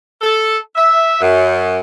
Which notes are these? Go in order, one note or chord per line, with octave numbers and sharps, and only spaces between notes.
A4
E5
F#2